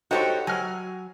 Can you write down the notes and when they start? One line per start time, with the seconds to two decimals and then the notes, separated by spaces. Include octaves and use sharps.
0.11 D#4 F#4 G4 A4 C5 C#5
0.47 F#3 G#5 F6